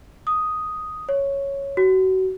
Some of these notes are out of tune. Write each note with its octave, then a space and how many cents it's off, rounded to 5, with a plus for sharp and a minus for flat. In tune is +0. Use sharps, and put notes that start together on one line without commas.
D#6 +0
C#5 +0
F#4 +30